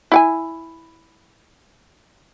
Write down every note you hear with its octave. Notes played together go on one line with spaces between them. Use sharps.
E4 F#5 G#5